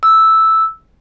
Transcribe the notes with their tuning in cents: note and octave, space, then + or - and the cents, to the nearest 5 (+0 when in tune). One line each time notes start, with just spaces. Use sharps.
E6 -5